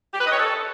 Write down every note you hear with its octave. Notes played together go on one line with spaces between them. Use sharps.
G4
B4
D#5
C#5
A4